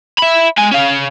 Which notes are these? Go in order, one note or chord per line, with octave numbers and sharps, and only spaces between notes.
E5 B5
G#3 G#5
C#4 F5